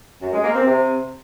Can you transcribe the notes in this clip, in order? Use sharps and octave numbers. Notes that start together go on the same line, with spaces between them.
F#2
G#3
A#3
C4
C3